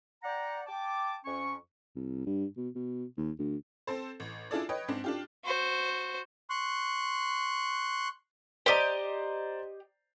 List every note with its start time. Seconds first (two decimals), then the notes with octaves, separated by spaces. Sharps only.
0.23 D5 F#5 G5 A#5
0.67 G5 A5 D6
1.25 F2 C#4 C#6
1.96 C2
2.26 G2
2.57 B2
2.75 B2
3.17 D#2
3.39 D2
3.87 C4 A4 C5
4.20 A1
4.51 D4 E4 F4 G#4 A4 D5
4.69 B4 C#5 D#5 G5
4.88 G#2 C4 D4
5.04 D4 F4 G4
5.44 F#4 C5
6.50 C6 C#6 F#6
8.66 G4 C5 D5 D#5 A#5